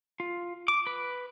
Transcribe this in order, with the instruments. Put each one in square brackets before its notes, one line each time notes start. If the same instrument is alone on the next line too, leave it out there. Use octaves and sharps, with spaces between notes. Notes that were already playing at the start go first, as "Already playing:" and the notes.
[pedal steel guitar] F4
D6
B4